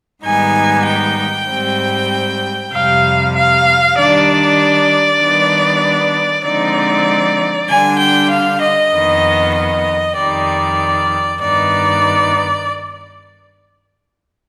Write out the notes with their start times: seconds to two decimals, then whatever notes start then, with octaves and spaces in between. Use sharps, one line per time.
0.24 G#2 D#3 G3 B3 D#4 G#5
0.87 G5
1.48 G#2 G3 C4
2.72 F2 C3 G3 F5
3.35 F5
3.96 D#3 G3 D4 D5
5.20 D#3 G3 B3 D4
6.44 D3 F3 G#3 C4 D#4 D5
7.68 D3 G3 D4 G#5
7.98 G5
8.30 F5
8.60 D#5
8.92 F2 D#3 B3
9.54 D#5
10.15 F2 D#3 G3 D5
11.40 G2 D#3 B3 D#4 D5